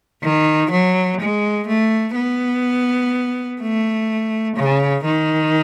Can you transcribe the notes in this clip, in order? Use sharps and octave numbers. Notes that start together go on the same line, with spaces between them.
D#3
F#3
G#3
A3
B3
A3
C#3
D#3